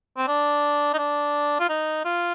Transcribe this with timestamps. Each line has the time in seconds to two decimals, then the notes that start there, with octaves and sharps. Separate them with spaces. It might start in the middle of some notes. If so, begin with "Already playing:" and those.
0.18 C4
0.28 D4
0.94 D#4
0.98 D4
1.60 F4
1.69 D#4
2.05 F4